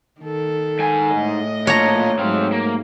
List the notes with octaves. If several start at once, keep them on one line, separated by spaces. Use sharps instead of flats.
D#3 A4
G#2 G#5
A2 D#5
A#2 D4 C#5 A#5
G#2 F#3 A3 C4 F5
A#3